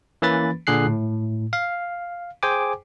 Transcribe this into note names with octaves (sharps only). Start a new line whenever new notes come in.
E3 A#3 C#4 B4 B5 A6
A#2 D3 G#4 F#6 C7
A2
F5
G#4 C5 G5 G#5 D6